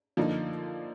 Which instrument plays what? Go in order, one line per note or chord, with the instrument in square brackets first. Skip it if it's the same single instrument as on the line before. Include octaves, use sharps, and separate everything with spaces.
[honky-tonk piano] D3 F3 A#3 D#4